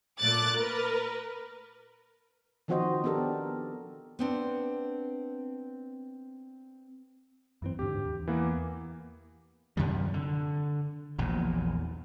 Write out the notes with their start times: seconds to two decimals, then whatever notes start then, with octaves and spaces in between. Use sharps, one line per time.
0.20 A#2 A3 D6 F#6 A6
0.54 A#4 B4
2.68 D#3 F3 C4 F#4 C5 D#5
3.04 B3 D4 G4 A4 A#4
4.19 B3 C4 D4
7.62 F#2 E3 C4
7.79 D2 G#2 D3 G4
8.06 E2
8.27 E3 A#3 B3
9.77 F#2 C3 D#3 G3
10.14 D3
11.19 A#1 E2 A#2